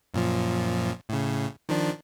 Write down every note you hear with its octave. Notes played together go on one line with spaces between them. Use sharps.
F#2 A#2 F3
A2 C#3
D#3 F3 D4